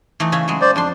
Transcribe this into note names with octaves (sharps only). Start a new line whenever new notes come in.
E3 A3 D#4
C#3 C#4 E5
C#3 F#3 G#3
C5 D5
F2 D4 A5 C6